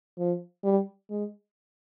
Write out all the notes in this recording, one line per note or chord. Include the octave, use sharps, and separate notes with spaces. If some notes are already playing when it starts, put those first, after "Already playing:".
F3
G3
G#3